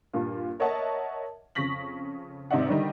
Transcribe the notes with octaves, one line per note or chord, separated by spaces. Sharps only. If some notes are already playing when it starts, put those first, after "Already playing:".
G2 A#2 F4
A#4 C#5 D#5 E5 F#5 A5
F2 C#3 C#6 A#6 B6 F#7
G#2 C3 D#4 D5 E5 F#5
D3 D#3 G3 D#4